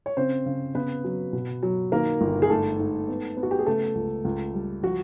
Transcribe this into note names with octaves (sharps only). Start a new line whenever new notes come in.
C#5
C#3 C4 C5
C#3
C#3 B3 B4
F#3
B2
F#3
D#3 A#3 A#4
G1
G#4
G#2 A3 A4
G#2
B3
B3
F#4
G4
G#4
C#3 A3 A4
C#2
C#2
G3
F3 F#4